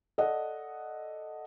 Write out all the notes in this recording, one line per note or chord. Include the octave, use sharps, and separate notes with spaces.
A4 D5 D#5 F#5